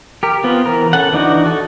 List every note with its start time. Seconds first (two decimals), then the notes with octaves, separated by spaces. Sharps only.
0.23 G4 A#4
0.44 B3 C4 F4
0.66 E3 A#4
0.93 C#4 A4 F#5
1.13 E3 D4 D#4 F#4
1.46 F#4 A4